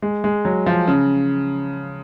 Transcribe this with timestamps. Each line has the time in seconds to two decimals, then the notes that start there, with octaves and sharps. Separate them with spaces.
0.02 G#3
0.24 G#3
0.45 F#3
0.66 F3
0.88 C#3